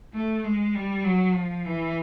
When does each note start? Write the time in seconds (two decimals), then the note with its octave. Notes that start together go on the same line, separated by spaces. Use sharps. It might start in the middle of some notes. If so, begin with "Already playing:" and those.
0.14 A3
0.44 G#3
0.75 G3
1.05 F#3
1.35 F3
1.66 E3